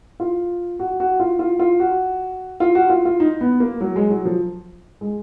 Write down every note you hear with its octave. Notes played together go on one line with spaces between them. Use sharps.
F4
F#4
F#4
F4
F4
F4
F#4
F4
F#4
F4
F4
D#4
B3
A#3
F#3
G#3
F#3
F3
G#3